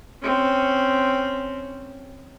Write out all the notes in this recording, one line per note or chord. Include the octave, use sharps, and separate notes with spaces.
C4 C#4